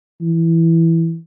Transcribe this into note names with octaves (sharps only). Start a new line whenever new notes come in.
E3